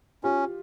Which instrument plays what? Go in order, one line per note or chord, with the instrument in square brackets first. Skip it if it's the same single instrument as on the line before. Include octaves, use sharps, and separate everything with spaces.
[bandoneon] C#4 [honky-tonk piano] F4 G4